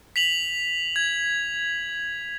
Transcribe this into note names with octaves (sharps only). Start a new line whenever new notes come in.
B6 F7 F#7
G#6